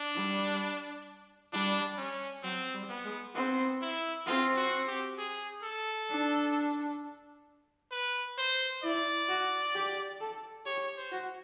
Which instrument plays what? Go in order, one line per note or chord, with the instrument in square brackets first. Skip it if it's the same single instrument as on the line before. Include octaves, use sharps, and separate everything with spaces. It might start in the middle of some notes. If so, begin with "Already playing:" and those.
Already playing: [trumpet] D4
[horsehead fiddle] G3
[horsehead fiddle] G3 [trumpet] D4
[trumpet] C#4
[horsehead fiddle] F#3 [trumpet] C4
[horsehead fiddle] G3
[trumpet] B3
[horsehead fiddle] G#3
[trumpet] B3 [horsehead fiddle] C4
[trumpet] E4
[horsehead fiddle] C4 [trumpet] F4
[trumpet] F#4
G4
G#4
A4
[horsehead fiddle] D4
[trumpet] B4
C5
[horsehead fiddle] E4 [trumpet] D5
[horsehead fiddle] F#4
G4
A4
[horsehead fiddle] G4 [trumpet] C#5
[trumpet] C5
[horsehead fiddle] F#4